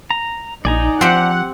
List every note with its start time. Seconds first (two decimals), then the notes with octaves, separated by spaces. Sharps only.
0.11 A#5
0.65 A#1 D#4 D5 G#5 A#5
1.01 F3 C4 G4 F#5